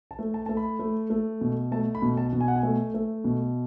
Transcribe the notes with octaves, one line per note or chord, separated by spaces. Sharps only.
A5
A3
A5
A3 A5
B5
A3
A3
B2
A3 A5
B5
B2
A5
B2
G#5
F#5
G#5
A3
A3
B2